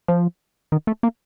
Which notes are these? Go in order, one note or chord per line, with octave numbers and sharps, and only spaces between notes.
F3
D#3
A3
A#3